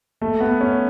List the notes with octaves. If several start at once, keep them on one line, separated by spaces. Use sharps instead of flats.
A3
B3
C#4